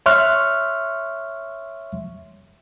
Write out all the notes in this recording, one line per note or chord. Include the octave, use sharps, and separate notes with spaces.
C#5 E5 C6 C#6 F6 F#6